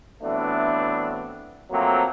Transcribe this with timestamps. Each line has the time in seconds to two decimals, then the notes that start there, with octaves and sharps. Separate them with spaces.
0.22 E3 F#3 A3 B3 C4 D4
1.70 F3 F#3 A3 A#3 C4